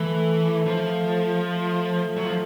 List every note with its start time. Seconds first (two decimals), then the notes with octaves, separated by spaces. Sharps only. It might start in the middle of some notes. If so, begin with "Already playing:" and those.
Already playing: E3 A3
0.66 F3
1.42 A3
2.17 F#3
2.25 F3